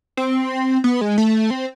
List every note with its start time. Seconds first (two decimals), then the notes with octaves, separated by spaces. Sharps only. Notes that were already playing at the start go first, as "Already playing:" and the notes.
0.17 C4
0.84 B3
1.01 G#3
1.18 A3
1.50 C4